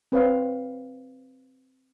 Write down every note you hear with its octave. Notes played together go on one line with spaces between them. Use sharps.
C4 B4 C#5 F5